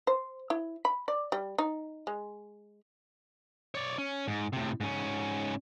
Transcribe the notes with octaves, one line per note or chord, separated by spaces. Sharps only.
C5
E4
B5
D5
G3
D#4
G#3
C#5 D5
C#4
G#2
A2 C3
G#2 C#4